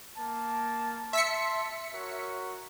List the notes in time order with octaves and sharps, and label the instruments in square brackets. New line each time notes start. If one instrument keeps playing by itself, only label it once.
[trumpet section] A#3 A5
[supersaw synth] E5 B6 C#7 [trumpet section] A5 C6
[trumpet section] F#4 A#4 C#5